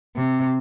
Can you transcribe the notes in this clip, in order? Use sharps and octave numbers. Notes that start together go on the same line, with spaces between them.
C3